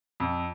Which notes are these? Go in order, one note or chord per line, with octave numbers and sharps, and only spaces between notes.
F2